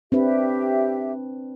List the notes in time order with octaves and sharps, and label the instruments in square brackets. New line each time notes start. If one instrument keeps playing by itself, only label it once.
[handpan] C4 D4 B4 [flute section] G4 E5